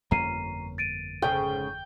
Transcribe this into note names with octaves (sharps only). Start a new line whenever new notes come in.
G1 F2 A#3 C#4 A#5 C7 D#7
A6 D7 D#7
G#2 C#3 A3 G5